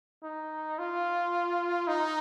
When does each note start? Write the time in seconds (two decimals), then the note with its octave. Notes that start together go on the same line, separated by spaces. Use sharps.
0.24 D#4
0.79 F4
1.88 D#4